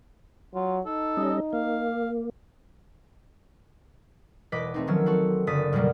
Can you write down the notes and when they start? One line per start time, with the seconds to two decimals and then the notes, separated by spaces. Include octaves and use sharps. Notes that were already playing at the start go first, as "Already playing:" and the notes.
0.54 F#3 F4
0.85 D#4 A4
1.17 G3 C#4 D#5
1.53 A#3 F5
4.52 E1 B4 D#5 D6 B6
4.74 A3 C4 D#4
4.87 D#3 F3 F#3 C#4 E6
5.06 C4 F#4 A4
5.47 F#1 D3 D#6 A6 B6
5.72 F#2 B2 F#3 G3 A#3